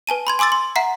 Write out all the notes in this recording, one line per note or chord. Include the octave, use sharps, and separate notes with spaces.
B4 G#5 A5 D#7
B5 C6 G#6
G#5 C6 D6 E6 A6
C6
E5 F#5 A#5 B6 C7